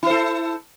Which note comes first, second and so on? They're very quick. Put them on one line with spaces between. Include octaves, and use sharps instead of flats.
E4 C5 A4